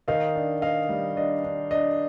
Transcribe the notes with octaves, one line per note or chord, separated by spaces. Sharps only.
D#3 D#5 F5
D4
D4 D#5 F5
G3
D4 D#5
D4
D4 D#5